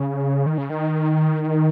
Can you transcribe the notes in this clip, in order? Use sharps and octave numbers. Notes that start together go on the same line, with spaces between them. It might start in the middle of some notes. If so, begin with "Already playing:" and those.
Already playing: C#3
D#3
C#3
D#3